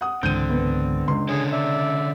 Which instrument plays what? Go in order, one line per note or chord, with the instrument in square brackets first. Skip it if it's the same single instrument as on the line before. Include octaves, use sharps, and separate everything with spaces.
[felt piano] F#5 D#6
[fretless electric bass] C#2 G#2 E3 [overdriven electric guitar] D3 [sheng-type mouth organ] C4 [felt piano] G6 D#7
[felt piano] B3 B4
[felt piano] C#2 C6 [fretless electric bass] C4 D4
[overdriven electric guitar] D3 C#4 [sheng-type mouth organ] G#4
[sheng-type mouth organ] D5 E5